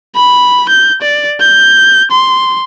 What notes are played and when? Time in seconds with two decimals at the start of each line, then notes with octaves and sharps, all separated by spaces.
0.15 B5
0.69 G6
1.02 D5
1.40 G6
2.11 C6